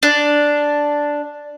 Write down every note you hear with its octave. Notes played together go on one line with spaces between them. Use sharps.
D4